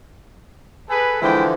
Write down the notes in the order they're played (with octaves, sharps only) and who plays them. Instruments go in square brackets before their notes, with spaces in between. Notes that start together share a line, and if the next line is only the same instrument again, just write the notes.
[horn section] G#4 A4 B4
[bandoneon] D3 E3 F3 [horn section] G#3 E4 G5